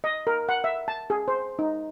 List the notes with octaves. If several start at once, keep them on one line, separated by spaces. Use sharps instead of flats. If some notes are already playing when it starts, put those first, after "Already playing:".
D#5
A#4
F#5
E5
A5
G#4
C5
D#4